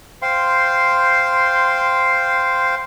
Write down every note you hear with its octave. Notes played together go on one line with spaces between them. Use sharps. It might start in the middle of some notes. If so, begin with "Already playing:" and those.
C5 F5 G5 C6